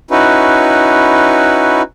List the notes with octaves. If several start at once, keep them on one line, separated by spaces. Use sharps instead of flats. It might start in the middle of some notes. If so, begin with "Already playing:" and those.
C#4 D#4 E4 F#4 B4